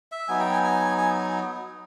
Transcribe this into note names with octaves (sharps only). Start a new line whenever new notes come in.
E5
F#3 B3 D#4 G#5
G5
G#5
G#5
G#5